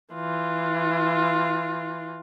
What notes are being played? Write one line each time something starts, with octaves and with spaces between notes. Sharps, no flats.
E3 F4